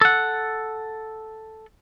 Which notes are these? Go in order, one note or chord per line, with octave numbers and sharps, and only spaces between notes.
A4 F#5